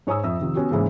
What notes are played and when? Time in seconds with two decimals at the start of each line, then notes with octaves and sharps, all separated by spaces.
0.07 G#2 C#5 G#5 A#5 D#6 E6
0.23 F2 E5 E6
0.40 C3 D#3 F3
0.55 B3 C#4 F#4 G4
0.71 G#2 C#3 E3 G#3 A#3 C#4